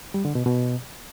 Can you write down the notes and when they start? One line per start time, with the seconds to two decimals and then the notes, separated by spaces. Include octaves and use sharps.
0.14 G3
0.25 D3
0.35 B2
0.46 B2